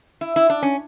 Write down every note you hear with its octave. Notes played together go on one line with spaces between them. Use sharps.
E4
E4
D4
C#4